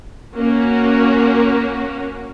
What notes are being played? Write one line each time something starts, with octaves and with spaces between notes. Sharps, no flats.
A#3 C#4 F#4